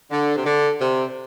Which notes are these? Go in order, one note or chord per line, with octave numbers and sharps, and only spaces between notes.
D3
C3
D3
C3